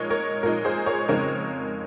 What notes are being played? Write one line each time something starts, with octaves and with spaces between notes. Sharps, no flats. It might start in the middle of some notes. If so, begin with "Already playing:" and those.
Already playing: A#2 F3 G#3 D#4 A#4 C#5
A#4 C#5
A#2 F3 G#3 D#4 A#4
G#4 C5
A#4 C#5
F2 C#3 G#3 C4 D#4 A#4 C#5